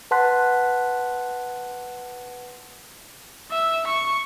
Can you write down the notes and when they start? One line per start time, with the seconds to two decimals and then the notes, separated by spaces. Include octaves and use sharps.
0.11 B4 F#5 A5 C6 F#6 B6
3.51 E5
3.87 C#6